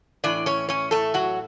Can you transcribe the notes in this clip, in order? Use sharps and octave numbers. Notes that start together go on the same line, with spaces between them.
A2 E3 D4 D5
C#4 C#5
C#4 C#5
A3 A4
F#3 F#4